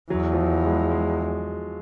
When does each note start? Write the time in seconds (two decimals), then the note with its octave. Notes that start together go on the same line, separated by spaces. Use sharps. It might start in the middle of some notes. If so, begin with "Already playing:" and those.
0.10 E2 F#3
0.33 F3
0.37 F#3
0.65 G#3
0.91 G#3